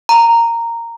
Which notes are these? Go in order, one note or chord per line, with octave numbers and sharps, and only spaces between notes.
A#5